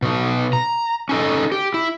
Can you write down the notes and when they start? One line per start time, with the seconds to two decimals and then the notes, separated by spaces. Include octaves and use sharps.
0.02 B2 D#4
0.53 A#5
1.09 C#4 D#4 A4 D#5
1.52 G4
1.74 E4